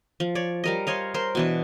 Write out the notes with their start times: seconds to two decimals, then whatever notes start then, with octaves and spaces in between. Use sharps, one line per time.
0.20 F3
0.35 C#5 D5
0.64 G3 A#4 D#5
0.87 C5 C#5 D#5 F5
1.14 A#4 C5
1.35 B2 E3 D4